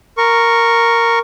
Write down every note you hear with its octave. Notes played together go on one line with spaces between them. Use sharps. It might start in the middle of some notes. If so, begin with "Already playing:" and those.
A#4 C#6